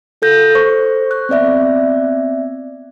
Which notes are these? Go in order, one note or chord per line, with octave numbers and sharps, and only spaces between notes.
F4 A4 G6 A#6
C5 C#6
F#6
B3 C4 D5 E5